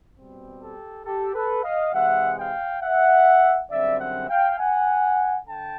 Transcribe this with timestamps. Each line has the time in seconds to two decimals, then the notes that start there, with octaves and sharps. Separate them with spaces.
0.17 B2 G3 C4
0.61 G4 A4
1.06 G4 A4
1.35 A4 B4
1.64 D#5 F5
1.94 C3 E3 G#3 E5 F#5
2.38 F5 G5
2.83 E5 F#5
3.70 F#2 D3 G3 C4 D5 E5
4.00 E5 F#5
4.30 F5 G5
4.59 F#5 G#5
5.47 D3 G5 A5